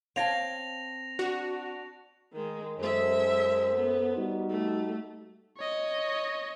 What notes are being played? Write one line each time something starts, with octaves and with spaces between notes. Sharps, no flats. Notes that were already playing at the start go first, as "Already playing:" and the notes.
C4 C#5 F5 G#5 A5 A#6 F7
D4 F#4
D#3 G#3
F#2 G#3 A4 C5 E5
B3
G3 D#4 F#4
A3
C#5 D#5